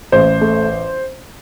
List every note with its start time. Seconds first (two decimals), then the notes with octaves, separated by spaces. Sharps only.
0.12 A1 C5
0.41 A3